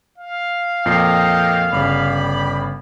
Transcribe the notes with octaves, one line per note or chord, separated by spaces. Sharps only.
F5
F2 A#2 D#5 G5 C7
G1 C#3 D5 G5 B5